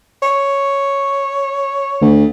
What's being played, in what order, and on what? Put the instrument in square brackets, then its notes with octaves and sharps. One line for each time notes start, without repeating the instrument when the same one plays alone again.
[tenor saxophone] C#5
[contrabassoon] D2